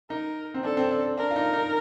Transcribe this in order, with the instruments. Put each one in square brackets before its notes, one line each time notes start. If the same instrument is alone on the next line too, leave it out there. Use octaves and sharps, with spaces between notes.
[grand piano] D#4 [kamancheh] A#4
[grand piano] C4
[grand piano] D4 [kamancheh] A4
[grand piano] C4
D4
[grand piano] D4 [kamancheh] A#4
[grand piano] F4
D#4
D#4